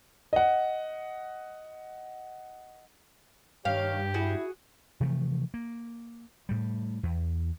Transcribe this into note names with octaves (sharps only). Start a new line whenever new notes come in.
D#5 F#5
G2 D#3 G4 C#5 F5
E4 F#4 G#4
C3 E3 F3 A3
A#3
A2 G3
E2